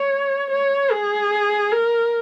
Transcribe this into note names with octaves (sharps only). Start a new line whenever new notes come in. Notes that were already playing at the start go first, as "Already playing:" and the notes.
Already playing: C#5
C#5
G#4
A#4